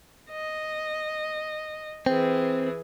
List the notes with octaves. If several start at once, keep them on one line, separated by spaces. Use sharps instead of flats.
D#5
E3 C4 G#4